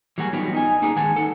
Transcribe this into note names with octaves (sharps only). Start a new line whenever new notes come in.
E3 F#3 G3 A#3 F#4 G#4
F#3 G3 B3 D4 D#4 F4
D#4 D#5 G#5
A#3 D#4 G#4 A4 B4
D#3 G#3 F#5 G#5 A5
D#4 A4